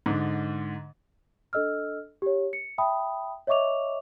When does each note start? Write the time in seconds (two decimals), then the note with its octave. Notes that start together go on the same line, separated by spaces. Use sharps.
0.06 G#2 D3
1.53 D4 A4 D#5 E6 F6
2.22 G4 C#5
2.53 C#7
2.78 E5 G5 A5 B5 D#6
3.47 C#5 D#5 E5 C#6 D6 F7